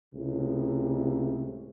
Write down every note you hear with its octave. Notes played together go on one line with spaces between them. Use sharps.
C#2 A2 C3